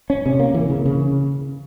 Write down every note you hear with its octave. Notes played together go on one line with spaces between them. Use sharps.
C#4
C3
A#3
E3
C#3
C#3